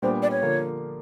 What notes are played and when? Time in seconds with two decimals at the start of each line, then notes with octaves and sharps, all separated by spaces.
0.02 A#2 G3 B3 D4 G4 C5
0.22 D5
0.31 C#5
0.41 D3 F3 A#3